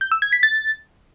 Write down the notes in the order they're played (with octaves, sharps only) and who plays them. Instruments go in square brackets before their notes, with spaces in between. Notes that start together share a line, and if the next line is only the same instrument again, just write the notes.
[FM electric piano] G6
E6
G#6
B6
A6